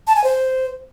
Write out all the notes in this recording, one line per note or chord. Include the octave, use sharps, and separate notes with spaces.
A5
G#5
C5